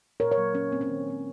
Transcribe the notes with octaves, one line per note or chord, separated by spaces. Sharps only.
A#2 A#4 C#5
A#4 C#5
F#3 A#3
A#2 C#4
F#3 A#3 C4
C#4
D#3
G#3 C4